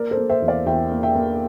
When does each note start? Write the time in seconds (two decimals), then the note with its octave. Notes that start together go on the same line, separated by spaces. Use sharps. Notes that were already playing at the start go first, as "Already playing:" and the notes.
Already playing: A#3 A#4 D5
0.11 A4 C5
0.17 A#3
0.29 C5 E5
0.42 E2
0.48 D5 F5
0.66 E2 E5 G5
0.91 A#3
1.03 E5 G5
1.15 A#3